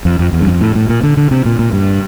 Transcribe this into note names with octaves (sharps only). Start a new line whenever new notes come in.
F2
F2
E2
G2
F2
A2
A2
A#2
D3
D3
C3
A#2
A#2
G2